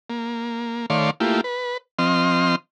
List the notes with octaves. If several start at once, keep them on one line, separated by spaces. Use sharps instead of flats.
A#3
D#3 A3 C#5 D5 F5 C6
A3 A#3 E4 F4 G4
B4
F3 C4 D#5 C6 F6